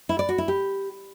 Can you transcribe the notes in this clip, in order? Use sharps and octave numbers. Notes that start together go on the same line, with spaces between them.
E4
D5
F#4
E4
G4